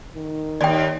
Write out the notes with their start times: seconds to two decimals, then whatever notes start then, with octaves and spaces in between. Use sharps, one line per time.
0.16 D#3
0.61 D#2 D5 G5